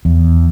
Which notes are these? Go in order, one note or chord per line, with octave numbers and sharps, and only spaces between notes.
E2